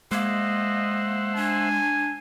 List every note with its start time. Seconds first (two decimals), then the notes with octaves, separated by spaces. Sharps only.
0.11 G#3 A#3 C5 D#5 E5 F#5
1.36 D4 G#5